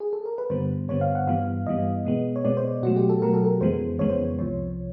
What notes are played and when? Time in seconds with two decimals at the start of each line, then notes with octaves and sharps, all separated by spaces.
0.00 G#4
0.13 A4
0.26 A#4
0.38 B4
0.50 G2 D3 G3 B3 C5
0.89 G2 D3 G3 B3 C#5
1.01 F5
1.15 F#5
1.27 G2 E3 G3 B3 F5
1.67 G2 E3 G3 B3 D#5
2.05 B2 G#3 B3
2.36 C#5
2.44 B2 G#3 B3 D5
2.57 C5
2.83 B2 F#3 A3 F#4
2.96 G4
3.09 A4
3.22 B2 F#3 A3 A#4
3.34 A4
3.45 A#4
3.61 F2 C#3 E3 G#3 B3 C5
3.99 F2 C#3 E3 G#3 B3 C#5
4.09 C5
4.39 C2 C3 F3 C#5